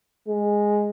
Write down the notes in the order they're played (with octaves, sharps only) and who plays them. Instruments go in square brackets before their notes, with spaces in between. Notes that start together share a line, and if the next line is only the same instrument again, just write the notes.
[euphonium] G#3